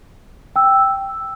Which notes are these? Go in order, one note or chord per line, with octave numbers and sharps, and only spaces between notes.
G5 E6